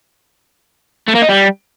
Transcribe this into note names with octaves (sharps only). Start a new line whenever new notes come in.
A3
A#3
D#4
G3